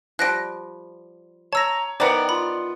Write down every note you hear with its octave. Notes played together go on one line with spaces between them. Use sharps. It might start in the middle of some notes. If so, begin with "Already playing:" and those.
F3 G3 F#6 A#6 D7
C#5 A5 A#5 E6 A#6
D#3 E3 B3 C5 D5 G5 A#5 C#7
F4 B5